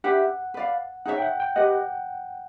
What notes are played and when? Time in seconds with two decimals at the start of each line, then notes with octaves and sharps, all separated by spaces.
0.04 D4 G4 B4 E5 F#5
0.54 B4 D5 F5
1.05 D#4 G#4 C#5 E5 F#5
1.18 G5
1.22 F#5
1.40 G5
1.56 G4 B4 D#5 F#5